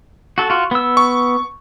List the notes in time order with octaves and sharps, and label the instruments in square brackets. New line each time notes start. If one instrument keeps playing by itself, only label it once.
[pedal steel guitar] F#4 A4
F4 F#4
B3 E6
[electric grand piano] C#6